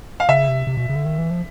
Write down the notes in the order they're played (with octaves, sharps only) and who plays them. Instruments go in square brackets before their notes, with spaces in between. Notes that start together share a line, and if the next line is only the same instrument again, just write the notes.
[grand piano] F5
[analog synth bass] C#3 [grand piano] E5
[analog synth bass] C3
C3
B2
C#3
D3
D#3
E3
F3